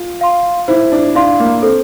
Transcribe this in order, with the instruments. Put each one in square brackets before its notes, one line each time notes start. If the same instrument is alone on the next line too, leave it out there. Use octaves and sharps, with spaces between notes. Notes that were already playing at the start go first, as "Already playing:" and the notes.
Already playing: [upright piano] F4
[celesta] F5 C6
[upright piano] E4 [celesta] C5
[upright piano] D4
[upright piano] D4 [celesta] F5 C6
[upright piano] A#3
[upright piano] C4 [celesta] A4